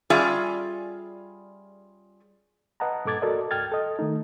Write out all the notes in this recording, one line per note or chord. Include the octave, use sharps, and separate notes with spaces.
G3 C#4 F4 G#4 D5 E5
B4 D#5 F#5 A5 A#5
G2 A#2 A4 D6 G#6 A6
F#4 A4 A#4 D5 D#5
C#2 G#2 G5 F6 G#6 A6
A4 D#5
D#3 A3 D#4